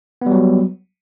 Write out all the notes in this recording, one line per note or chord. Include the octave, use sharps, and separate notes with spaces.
F#3 G3 B3